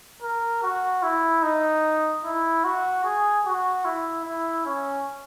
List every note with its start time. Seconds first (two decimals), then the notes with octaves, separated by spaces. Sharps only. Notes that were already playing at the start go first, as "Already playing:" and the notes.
0.22 A#4
0.63 F#4
1.03 E4
1.43 D#4
2.24 E4
2.64 F#4
3.04 G#4
3.46 F#4
3.85 E4
4.25 E4
4.66 C#4